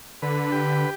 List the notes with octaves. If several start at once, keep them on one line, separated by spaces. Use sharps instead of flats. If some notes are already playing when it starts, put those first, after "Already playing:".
D3 B4
G4